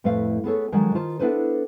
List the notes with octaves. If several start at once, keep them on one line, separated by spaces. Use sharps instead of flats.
F2 A2 A3 B4 C5 F5
B3 G#4 A4 C#5
D3 D#3 F3 F#3 G#3 A#4
D#3 F4 C5 A5
B3 D4 E4 A4 B4 C5